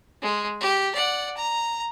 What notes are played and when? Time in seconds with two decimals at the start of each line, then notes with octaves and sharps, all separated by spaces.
0.22 G#3
0.61 G4
0.95 D5 F#5
1.37 A#5